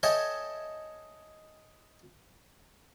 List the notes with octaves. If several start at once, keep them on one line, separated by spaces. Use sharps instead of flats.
A4 C#5 D#5 E5 G5 G#5